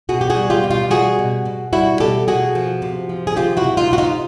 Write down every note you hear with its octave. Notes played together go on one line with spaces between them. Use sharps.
B2 F#4 G#4
G4
F#4 G#4
G3
F4 G4
B2
F4 G4
G3 F#4 G#4
B2
B2
G3 E4 F#4
B2 G4 A4
B2 F#4 G#4
F3
C3
F3
G#4
C3 F4 G4
E4 F#4
C3
D#4 F4
C3 F#4
D#4 F4